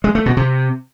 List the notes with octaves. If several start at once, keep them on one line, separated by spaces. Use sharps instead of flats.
G#3
A3
B2
C3